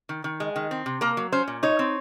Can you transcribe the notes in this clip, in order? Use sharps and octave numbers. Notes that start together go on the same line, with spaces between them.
D#3
D#3
G#3
D#3
C4
C3
A#3 A#4
F#3
C#4 C5
A#2
D#4 C#5
C4